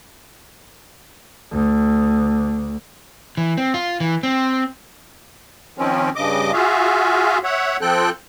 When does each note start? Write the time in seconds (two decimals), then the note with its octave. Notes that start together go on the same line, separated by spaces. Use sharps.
1.51 D2
3.37 E3
3.57 C4
3.74 F4
4.00 E3
4.23 C4
5.78 D#3 F3 C4 C#4
6.16 G2 C#3 D#5 D6
6.53 F4 F#4 G#4 E5 F5
7.44 C#5 E5 F#5
7.81 F3 C4 A4 G5 F#6